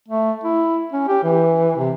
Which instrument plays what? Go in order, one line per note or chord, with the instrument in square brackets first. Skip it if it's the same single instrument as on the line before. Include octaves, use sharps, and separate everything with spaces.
[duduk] A3
E4
C#4
G4
E3
C3